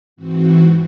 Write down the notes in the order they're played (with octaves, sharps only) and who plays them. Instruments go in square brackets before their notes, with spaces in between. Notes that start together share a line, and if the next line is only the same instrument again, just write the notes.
[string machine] G#2 E3 C4 F#4